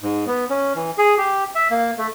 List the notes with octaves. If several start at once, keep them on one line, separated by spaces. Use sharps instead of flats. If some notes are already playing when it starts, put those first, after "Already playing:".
G#2
B3
C#4
E3
G#4
G4
E5
A#3
A3